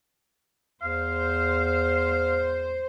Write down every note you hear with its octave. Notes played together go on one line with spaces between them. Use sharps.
E2 C5 F5